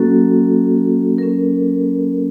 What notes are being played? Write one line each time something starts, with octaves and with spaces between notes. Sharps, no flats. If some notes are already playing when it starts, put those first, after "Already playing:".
Already playing: F#3 A#3 C#4 F#4 A4
F#3 A#3 C#4 A#4